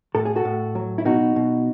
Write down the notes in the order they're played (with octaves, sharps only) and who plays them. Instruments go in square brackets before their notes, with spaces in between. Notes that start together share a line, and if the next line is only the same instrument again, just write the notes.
[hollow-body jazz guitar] A2 A4
G#4
F#4 A4
A2
F#3
E4
B2 D#4 F#4
B2